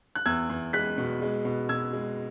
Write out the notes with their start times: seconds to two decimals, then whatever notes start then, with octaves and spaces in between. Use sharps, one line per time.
0.15 F#6
0.26 E2 E6 G#6
0.49 E2
0.73 G#3 F#6 B6
0.98 B2
1.22 G#3
1.45 B2
1.69 B2 E6 G#6
1.93 G#3